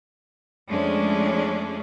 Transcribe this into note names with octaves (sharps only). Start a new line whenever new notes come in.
F2 G#3 A3 C#4 D4